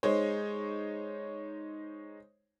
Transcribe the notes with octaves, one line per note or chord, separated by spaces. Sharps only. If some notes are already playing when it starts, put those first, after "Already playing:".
G#3 D#4 C5 C#5